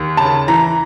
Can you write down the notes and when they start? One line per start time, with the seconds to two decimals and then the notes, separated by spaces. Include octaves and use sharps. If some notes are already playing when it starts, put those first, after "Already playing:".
Already playing: D#2
0.17 C#3 A5
0.48 E3 A#5